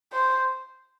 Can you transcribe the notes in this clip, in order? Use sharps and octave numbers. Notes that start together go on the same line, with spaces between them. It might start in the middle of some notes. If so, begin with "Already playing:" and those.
C5